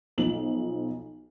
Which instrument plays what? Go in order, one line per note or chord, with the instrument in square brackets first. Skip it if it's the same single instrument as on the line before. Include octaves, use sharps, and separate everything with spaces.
[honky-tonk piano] B1 F3 F#7